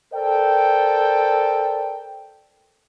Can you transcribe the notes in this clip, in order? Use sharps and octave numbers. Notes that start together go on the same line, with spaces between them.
A4 A#4 C5 D5 G5